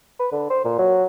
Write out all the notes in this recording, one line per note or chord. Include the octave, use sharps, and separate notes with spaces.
B4
D3
C5
A#2
F#3